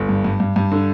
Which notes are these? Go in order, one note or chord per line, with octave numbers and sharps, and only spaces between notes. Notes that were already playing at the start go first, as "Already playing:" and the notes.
Already playing: G1
G2
G2
G2
G2
D3